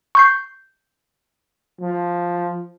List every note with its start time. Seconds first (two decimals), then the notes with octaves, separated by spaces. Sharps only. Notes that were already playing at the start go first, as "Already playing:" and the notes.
0.15 C#6 G6 C7
1.80 F3